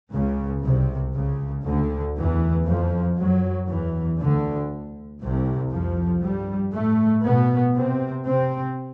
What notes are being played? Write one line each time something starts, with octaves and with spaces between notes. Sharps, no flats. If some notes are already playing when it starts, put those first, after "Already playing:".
C#2 C#3
C2 C3
C#2 C#3
D2 D3
E2 E3
F2 F3
F#2 F#3
E2 E3
D2 D3
C2 C3
F2 F3
G2 G3
A2 A3
B2 B3
C3 C4
C3 C4